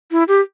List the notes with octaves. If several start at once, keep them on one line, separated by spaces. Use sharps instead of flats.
E4
G4